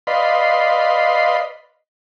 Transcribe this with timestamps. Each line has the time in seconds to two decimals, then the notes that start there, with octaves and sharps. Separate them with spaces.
0.07 B4 D5 D#5 F5 B5 C6